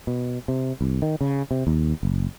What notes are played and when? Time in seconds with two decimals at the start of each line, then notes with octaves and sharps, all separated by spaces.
0.07 B2
0.48 C3
0.81 C2
1.02 D#3
1.21 C#3
1.51 C3
1.67 D#2
2.03 F#1